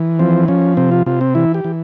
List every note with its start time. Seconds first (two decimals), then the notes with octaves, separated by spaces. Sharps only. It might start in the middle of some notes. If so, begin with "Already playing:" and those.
Already playing: E3
0.19 F3 C4
0.48 F3 C#4
0.77 C3 C4
0.92 F4
1.06 C3 F4
1.21 C4
1.35 E3 E4
1.54 G4
1.64 E3